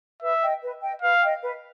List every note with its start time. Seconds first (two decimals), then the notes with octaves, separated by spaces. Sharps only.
0.22 B4 E5
0.42 D#5 G5
0.62 B4
0.82 D#5 G5
1.02 B4 F5
1.22 D#5 G5
1.42 B4